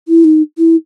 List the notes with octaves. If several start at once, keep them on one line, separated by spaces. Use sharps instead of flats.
E4
D#4
E4